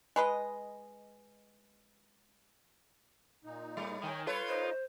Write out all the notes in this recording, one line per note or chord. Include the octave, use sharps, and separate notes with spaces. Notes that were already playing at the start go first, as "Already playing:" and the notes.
G#3 B4 D#5
A#2 D#4
A2 G3
D#3 C#5 G5 G#5
G3 F4 A4 B4 C#5 E6
D#4 C5 D#5